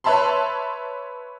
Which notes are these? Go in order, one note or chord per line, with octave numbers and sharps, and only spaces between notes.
B4 C#5 E5 A5 B5 C6